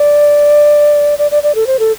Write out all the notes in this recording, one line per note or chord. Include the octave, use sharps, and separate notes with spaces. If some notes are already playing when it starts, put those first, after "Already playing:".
Already playing: D5
D5
D5
D5
A4
C5
A4